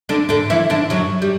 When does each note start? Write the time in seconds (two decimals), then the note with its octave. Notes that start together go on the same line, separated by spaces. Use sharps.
0.09 D3 D4
0.29 D3 D4
0.50 E3 E4
0.70 D3 D4
0.90 F#2 F#3
1.22 G3